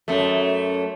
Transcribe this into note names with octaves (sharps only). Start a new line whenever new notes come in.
F#2 A3